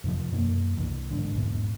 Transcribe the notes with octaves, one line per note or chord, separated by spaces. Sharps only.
F2 C3 F3
F#2 B2 A#3
C2 E3
A1 G#2 D3
E1 G#2 B2